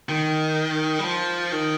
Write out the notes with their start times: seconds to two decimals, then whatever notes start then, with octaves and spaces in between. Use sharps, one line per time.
0.09 D#3
0.99 G3
1.05 F3
1.52 D#3